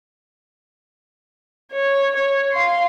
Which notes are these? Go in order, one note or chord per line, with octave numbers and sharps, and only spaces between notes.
C#5
C#5
F5 C6